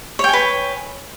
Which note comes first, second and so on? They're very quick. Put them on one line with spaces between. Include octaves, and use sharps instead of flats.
C#5 G5 G#5 B4